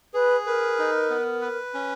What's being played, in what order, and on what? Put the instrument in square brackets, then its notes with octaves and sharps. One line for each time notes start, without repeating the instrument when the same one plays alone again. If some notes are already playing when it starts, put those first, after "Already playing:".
[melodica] G#4 [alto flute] B4
[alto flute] A#4 [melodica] B4
[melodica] D#4
B3
B4
C#4